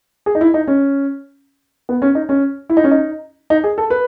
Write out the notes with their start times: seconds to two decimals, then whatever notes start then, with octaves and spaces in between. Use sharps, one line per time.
0.26 G#4
0.35 D#4
0.41 E4
0.54 D#4
0.67 C#4
1.89 B3
2.02 C#4
2.15 D#4
2.29 C#4
2.70 E4
2.77 D#4
2.84 C#4
2.91 D#4
3.50 D#4
3.64 G#4
3.78 A4
3.90 B4